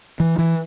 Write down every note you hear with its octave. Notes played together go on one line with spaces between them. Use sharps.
E3
E3